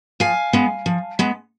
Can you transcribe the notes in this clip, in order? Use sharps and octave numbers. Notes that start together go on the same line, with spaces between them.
F3 F5 G#5
G#3 B3
F3
G#3 B3